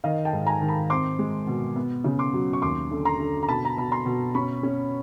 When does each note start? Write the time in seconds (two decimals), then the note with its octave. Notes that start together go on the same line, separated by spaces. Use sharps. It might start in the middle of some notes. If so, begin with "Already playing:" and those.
0.04 D#3 D#5 F5
0.25 G5 A5
0.33 G#2
0.46 G#5 A#5
0.61 D#3
0.68 A5 B5
0.90 C4 C6 D6
1.19 G#3
1.47 B2
1.76 B3
2.04 C#3
2.19 C6 D6
2.34 F#3
2.53 C#6
2.62 D#2 C6 D6
2.91 D3
3.05 A#5 C6
3.20 D3
3.43 A#5
3.48 B2 A5 B5
3.65 A#5
3.77 B2 B5
3.92 A#5 C6
4.06 B2
4.35 C#4 B5 C#6
4.63 C#4